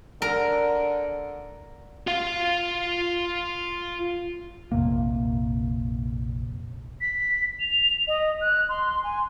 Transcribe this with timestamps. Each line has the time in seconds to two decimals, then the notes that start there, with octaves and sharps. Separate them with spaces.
0.22 D3 A#4
2.07 F4 F5
4.72 A#1 F2 C3 A#3
7.01 B6
7.60 F7
8.08 D#5
8.41 F#6
8.69 C6
9.04 G#5